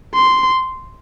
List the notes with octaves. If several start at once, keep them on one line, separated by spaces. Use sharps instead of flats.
C6